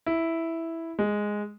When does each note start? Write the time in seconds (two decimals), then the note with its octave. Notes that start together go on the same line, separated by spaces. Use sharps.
0.06 E4
0.99 G#3